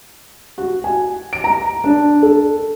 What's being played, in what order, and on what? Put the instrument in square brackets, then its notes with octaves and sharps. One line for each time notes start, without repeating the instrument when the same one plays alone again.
[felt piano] F#4
G#5
D7
A#5
D4
A4